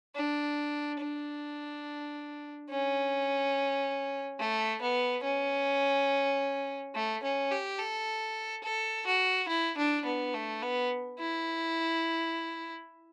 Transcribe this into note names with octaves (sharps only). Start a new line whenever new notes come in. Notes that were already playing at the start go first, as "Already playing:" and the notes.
D4
D4
C#4
A3
B3
C#4
A3
C#4
G4
A4
A4
F#4
E4
D4
B3
A3
B3
E4